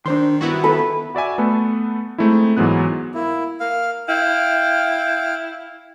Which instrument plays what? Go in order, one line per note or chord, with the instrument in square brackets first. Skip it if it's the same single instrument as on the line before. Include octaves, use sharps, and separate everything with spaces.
[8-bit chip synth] D#3 [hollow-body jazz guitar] D4 C5 C6
[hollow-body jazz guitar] G2 [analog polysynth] B3 E4 F#4
[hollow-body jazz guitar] A4 [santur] B4
[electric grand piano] F#4 D5 E5 G#5
A3 B3 A4 B4
G#3 A3 C4 D#4 E4
G#2 E3 F#3 B3 F#6
[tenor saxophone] A#3 [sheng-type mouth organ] E4
[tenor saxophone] A#3 [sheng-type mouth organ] F5
[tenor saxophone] E4 [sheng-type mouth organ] F5 G5